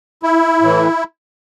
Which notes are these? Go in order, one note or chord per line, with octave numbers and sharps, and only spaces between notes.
E4
A2 E3